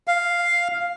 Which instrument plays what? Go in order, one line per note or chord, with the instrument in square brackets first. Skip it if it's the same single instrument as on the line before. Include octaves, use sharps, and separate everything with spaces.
[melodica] F5